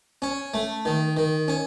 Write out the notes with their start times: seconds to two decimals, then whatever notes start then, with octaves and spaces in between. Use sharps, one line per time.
0.22 C#4
0.54 A3
0.85 D#3
1.17 D#3
1.48 C#4